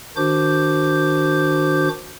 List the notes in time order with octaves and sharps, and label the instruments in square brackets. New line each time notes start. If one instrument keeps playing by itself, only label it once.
[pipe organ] D#3 D4 F#4 C5 D6 G6